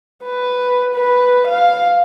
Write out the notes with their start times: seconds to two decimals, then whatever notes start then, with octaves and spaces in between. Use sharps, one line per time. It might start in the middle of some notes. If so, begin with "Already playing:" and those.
0.24 B4
0.95 B4
1.47 F5